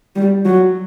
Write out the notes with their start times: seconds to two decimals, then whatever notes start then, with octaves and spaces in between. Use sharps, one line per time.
0.16 G3
0.45 F#3